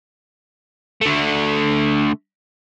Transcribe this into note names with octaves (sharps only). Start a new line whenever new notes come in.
D3 A3